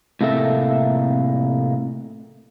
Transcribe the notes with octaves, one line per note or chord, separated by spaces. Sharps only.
A2 C3 A#3 A4 E5